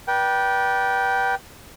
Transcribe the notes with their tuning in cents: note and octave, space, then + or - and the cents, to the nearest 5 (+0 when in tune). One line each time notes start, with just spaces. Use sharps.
B4 -35 D5 +0 G5 -15